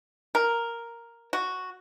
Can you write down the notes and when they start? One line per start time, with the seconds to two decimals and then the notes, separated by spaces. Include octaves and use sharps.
0.35 A#4
1.33 F#4